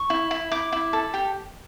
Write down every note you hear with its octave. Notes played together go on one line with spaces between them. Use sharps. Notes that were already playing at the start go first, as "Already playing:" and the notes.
Already playing: C#6
E4
E4
E4 D6
E4
A4
G4